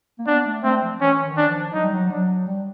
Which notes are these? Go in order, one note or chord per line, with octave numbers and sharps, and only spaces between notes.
A#3
B3 D4
A3
A3 C4
F3
E3 C#4
D#3
D4
F3
F#3 D#4
G3
F#3
F#3 D4
G3